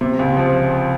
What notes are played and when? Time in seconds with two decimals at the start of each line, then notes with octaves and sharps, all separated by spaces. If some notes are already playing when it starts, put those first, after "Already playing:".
0.01 C3
0.19 C#2
0.37 F3